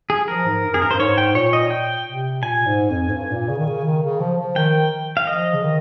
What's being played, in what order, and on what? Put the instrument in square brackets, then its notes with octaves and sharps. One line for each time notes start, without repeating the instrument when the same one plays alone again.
[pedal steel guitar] G#4
[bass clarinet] F3 [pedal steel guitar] A#4
[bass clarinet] G#2
G2
[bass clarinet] F2 [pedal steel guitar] G#4
[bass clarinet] G2 [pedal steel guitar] A#4
[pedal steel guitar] C5
[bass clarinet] G2
[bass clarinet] G#2 [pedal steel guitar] C#5
[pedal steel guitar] G5
[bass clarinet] A#2 [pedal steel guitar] C#5
[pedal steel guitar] D#5
G5
[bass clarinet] C3
[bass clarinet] A#2 [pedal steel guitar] G#5
[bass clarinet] G#2
F2
G#2
G2
A#2
C#3
D#3
C#3
D#3
C#3
F3
F3
[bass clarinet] D#3 [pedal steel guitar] G5
[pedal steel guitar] F5
[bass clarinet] F3 [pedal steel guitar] D#5
[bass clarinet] C#3
D#3